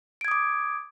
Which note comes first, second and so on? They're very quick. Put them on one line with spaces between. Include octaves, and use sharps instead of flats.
D7 G#6 D#6 D6